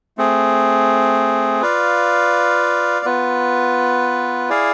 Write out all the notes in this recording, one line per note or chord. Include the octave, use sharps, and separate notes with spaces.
A3 C4 G#4
F4 B4 D5 F5
B3 F4 B4
E4 G#4 D5 F5